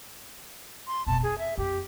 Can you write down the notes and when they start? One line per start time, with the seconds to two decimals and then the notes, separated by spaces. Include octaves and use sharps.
0.87 C6
1.07 F1 B2 A5
1.23 F2 G#4
1.39 E5
1.58 F2 G4